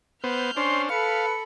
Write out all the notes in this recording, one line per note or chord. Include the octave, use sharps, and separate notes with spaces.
B3 C5 F6 G6
C#4 D4 C5 C6
A4 B4 F5 B5 C#7